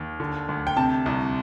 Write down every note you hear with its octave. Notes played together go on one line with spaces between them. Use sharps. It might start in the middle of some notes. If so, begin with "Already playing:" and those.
Already playing: D#2
D3
D2
G5
C3 A5
C2